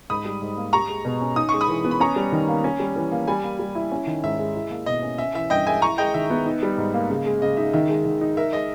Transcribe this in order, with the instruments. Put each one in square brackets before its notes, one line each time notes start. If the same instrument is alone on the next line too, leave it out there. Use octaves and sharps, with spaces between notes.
[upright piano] G#2 [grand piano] B5 D#6
[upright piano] G3
G#2
A#3
[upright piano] G4 [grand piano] A#5 C#6
[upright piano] G#3
B2
C#4
[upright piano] D#4 [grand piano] D#6
[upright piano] G#3 [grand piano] C#6
[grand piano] B5 D#6
[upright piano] E3
B3
[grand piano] B5
[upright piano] C#4 [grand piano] A#5 C#6
[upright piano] G3
D#3
A#3
C#4
G3
E3
A#3
[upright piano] G3 [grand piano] G#5 B5
[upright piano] A#3
G3
E4
C#4
D#3
[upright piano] G#2 [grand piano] E5
[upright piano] G#3
E4
A#3
[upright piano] B2 [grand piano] D#5
[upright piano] C#4
[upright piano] C#4 [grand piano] E5
[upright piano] E3 [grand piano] E5
[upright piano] G2 [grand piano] D#5 G5
[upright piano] G#3 [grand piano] E5 G#5
[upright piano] E4 [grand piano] A#5 C#6
[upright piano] G#3 [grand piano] D#5 G5
[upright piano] D#3 [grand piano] E5
[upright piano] B3
D#4
G3
G#2
A#3
C#3
G#3
[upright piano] C#3 [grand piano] D#5
[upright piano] D#4 [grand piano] E5
[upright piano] D#3 [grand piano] E5
[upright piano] G#3
D#3
D#4
[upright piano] A#4 [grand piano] E5
[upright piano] G#3 [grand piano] D#5